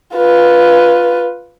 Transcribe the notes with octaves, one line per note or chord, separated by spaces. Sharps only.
F4 B4